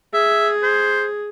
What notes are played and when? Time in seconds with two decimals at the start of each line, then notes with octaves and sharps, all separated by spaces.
0.14 G#4 E5
0.63 C5